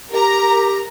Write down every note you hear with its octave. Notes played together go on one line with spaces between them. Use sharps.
G4 A#4 A#5